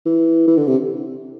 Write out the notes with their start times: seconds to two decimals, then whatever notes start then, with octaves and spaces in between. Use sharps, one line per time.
0.06 E3
0.48 E3
0.57 D3
0.68 C3